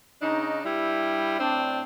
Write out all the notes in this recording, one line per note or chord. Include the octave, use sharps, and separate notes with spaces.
C#3 D4 D#4
G2 G3 E4
A2 C4 D4